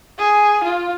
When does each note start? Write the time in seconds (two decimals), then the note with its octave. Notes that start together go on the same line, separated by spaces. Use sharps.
0.18 G#4
0.64 F4